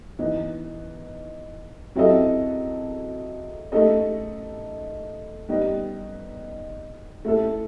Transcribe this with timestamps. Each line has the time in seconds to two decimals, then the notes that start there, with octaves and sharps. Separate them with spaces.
0.19 E3 B3 D#4
1.95 F#3 C4 E4 A4 D#5
3.72 A3 D#4 A4 D#5
5.49 G3 B3 D#4
7.25 A3 E4 A4